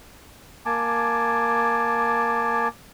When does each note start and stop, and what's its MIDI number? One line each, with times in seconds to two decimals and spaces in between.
0.66 2.68 58
0.66 2.68 80
0.66 2.68 81
0.66 2.68 86